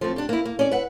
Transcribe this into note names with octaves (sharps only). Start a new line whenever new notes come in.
F3 A3 C4
D4 G4
A#3 E4
A#3
C#4 D5
B4 E5 F#5